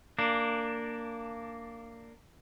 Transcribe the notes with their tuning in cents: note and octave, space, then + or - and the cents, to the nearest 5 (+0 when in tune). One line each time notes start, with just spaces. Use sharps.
A#3 -15 D4 +0